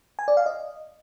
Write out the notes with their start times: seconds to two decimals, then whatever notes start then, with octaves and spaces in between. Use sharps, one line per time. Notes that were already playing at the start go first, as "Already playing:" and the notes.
0.19 G#5
0.28 D5
0.37 F5
0.46 D#5